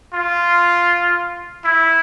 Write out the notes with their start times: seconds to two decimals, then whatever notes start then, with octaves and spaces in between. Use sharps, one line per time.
0.13 F4
1.65 E4